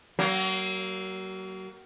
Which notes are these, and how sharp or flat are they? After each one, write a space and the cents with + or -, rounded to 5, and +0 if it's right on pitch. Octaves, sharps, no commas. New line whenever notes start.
F#3 +35 A#3 +0